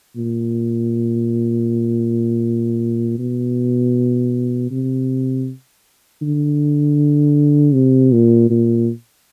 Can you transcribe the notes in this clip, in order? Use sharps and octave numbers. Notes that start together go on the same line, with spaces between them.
A#2
B2
C3
D3
C3
A#2
A#2